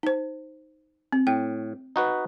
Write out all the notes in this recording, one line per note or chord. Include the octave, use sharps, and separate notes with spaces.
D#4 C5
C4
A2 G5
D#4 F#4 B4